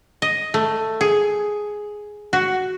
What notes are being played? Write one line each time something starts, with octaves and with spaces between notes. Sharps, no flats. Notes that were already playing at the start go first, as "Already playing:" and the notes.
D#5
A3
G#4
F#4